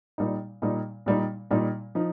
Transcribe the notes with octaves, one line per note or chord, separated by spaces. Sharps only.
A#2 G3 D#4
A#2 G3 D#4
A#2 G3 D#4
A#2 G3 D#4
F3 D#4